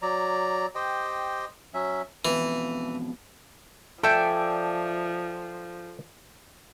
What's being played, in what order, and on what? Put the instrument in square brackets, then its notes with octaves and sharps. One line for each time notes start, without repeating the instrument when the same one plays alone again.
[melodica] F#3 D5 A#5
G4 C5 D#5 G5
F#3 C#4 E5
[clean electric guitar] F2 B2 [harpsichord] E3
[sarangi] F3 [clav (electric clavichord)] A4 E5 [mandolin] D5 G5 G#5